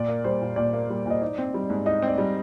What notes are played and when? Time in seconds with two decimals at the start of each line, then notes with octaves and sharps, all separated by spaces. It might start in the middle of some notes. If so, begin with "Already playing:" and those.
Already playing: A#2 D5
0.08 A#3
0.24 G3 C5
0.41 A#2
0.56 A#2 D5
0.73 A#3
0.90 G3
1.06 A#2 D#5
1.21 D#4 D5
1.38 C4
1.54 G3
1.70 G#2
1.86 D#4 D#5
2.02 C4
2.08 D5
2.18 G3